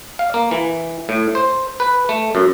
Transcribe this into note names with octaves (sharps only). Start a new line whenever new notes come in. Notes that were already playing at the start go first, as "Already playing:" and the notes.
F5
A#3
E3
A2
C5
B4
A3
F#2